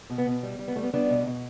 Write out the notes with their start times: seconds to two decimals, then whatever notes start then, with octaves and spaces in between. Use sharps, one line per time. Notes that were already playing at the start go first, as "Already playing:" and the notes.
0.10 B2
0.18 B3
0.26 B2
0.43 G3
0.59 G3
0.68 B3
0.76 G3 A3
0.83 B3
0.94 G3 B3 D4
1.10 B2
1.26 B2